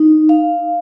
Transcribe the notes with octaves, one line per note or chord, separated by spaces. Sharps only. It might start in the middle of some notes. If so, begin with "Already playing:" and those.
Already playing: D#4
F5